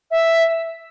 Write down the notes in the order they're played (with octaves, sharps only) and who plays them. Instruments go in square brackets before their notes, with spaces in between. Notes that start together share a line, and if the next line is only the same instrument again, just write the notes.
[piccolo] E5